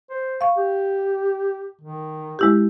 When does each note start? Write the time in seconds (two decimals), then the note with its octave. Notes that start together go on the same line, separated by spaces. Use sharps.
0.10 C5
0.41 F5 C#6
0.57 G4
1.81 D#3
2.39 G#3 E4 G4